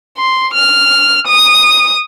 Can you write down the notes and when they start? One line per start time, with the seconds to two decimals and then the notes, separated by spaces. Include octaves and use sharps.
0.18 C6
0.54 F6
1.27 D#6